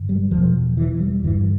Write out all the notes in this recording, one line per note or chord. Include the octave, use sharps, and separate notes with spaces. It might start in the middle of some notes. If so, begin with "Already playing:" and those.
Already playing: G2 D3
G3
E2 B2 F3
E3
G3
G2 D3 E3